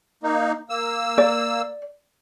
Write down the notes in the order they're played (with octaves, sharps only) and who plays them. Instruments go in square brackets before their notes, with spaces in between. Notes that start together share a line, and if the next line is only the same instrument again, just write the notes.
[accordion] A#3 D#4
A#3 E6
[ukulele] D5